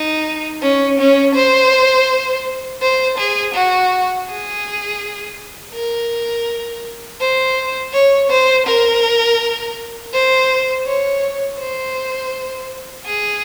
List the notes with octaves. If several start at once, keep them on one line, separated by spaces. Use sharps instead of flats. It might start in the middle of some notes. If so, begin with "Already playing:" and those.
Already playing: D#4
C#4
C#4
C5
C5
G#4
F#4
G#4
A#4
C5
C#5
C5
A#4
C5
C#5
C5
G#4